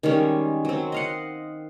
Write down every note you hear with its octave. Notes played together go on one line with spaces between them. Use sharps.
D#3 G3 G#3 C#4
F#3 C4
D#5 F5 F#5